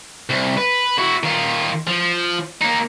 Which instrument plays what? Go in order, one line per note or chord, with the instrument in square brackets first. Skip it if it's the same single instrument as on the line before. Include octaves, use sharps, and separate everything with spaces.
[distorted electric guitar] C2
B4
E4 F#4
D#3 F4
F3
A#3 D#4